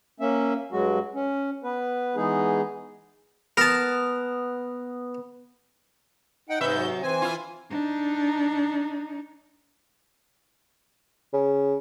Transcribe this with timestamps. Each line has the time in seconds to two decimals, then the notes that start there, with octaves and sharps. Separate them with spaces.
0.20 A#3 C#4 E5
0.72 G2 F#3 G#3 F#4
1.14 C#4
1.64 B3 B4
2.16 E3 G#3 B3 D#4 G#4
3.57 B3 A#4 A5
6.50 D#4 F#5 G5
6.61 G#2 C3 B4 E5 G6
6.77 F#3
7.03 E3 C4 G#5
7.22 E4 F4
7.70 D4 D#4
11.33 C#3